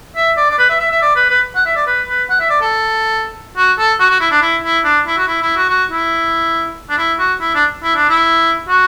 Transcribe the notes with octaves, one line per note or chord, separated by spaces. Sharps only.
E5
D5
D5
B4
E5
E5
E5
D5
B4
B4
F#5
E5
D5
B4
B4
F#5
E5
D5
A4
F#4
A4
F#4
F#4
E4
D4
E4
E4
D4
E4
F#4
E4
E4
F#4
F#4
E4
D4
E4
F#4
E4
D4
E4
D4
E4
F#4